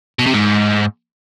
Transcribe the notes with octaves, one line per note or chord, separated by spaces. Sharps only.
B2
C3
G#2